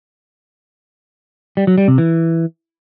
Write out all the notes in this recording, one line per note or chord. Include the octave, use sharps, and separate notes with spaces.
G3
F#3
G3
C3
E3